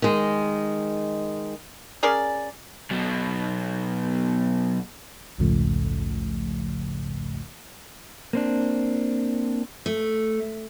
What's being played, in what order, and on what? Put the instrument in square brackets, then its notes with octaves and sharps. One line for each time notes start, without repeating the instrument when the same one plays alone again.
[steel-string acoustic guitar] D#3 G#3
[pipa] C#4 G#4 A#4 D5
[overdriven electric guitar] B1 B2
[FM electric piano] A#1 D#2 G#2 C#3 F3 A3
[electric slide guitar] A#3 C4 D4
[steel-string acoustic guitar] A3